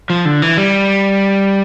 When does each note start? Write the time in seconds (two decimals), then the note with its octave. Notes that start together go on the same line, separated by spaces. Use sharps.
0.10 F3
0.25 D3
0.42 E3
0.57 G3